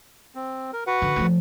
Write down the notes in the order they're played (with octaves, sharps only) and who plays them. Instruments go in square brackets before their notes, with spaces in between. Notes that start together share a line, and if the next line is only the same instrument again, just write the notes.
[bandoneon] C4
A#4
F#4 B4 F#5
[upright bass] D3
F3 A3